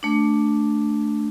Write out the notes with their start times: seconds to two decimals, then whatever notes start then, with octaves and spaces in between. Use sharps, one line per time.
0.03 A3 D4